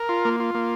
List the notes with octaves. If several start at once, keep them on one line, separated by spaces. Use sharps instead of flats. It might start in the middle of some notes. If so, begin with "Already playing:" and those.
Already playing: A#4
F4
A#3
F4
A#3